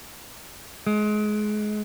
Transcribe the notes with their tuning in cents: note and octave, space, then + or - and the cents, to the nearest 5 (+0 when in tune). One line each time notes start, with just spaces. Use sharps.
G#3 +25